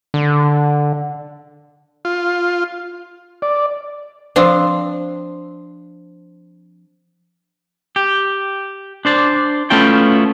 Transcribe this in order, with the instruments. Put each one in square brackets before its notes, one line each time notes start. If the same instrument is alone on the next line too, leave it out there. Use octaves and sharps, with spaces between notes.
[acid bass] D3
[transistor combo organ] F4
D5
[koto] F3 C4 D4
[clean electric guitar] G4
D4 C5 D5
A3 B3 C#4 E4 F4 G5